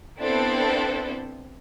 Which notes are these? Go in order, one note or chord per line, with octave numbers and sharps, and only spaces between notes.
B3 C4 D4 E4 A4 C5